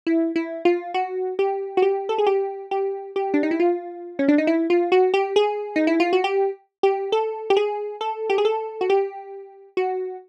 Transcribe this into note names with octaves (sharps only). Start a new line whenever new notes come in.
E4
E4
F4
F#4
G4
F#4
G4
A4
G#4
G4
G4
G4
D4
D#4
E4
F4
C#4
D4
D#4
E4
F4
F#4
G4
G#4
D#4
E4
F4
F#4
G4
G4
A4
G4
G#4
A4
G4
G#4
A4
F#4
G4
F#4